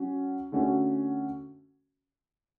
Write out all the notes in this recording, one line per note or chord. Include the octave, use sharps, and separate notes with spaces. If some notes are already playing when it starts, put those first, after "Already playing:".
Already playing: F#3 C#4 F#4
D3 A3 C#4 F#4